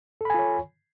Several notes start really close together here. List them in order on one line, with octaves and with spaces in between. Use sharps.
A4 B5 G#5 F4 C#5